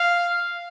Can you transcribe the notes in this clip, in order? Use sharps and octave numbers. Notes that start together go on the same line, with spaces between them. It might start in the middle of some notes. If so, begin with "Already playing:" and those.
Already playing: F5